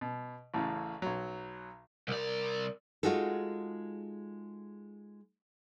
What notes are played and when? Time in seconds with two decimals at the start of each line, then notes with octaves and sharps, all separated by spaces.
0.01 B2
0.54 A1 A2 C#3
1.02 B1 F#3
2.08 C2 A#4 D5
3.03 G#3 D#4 F4 F#4 G#4 A4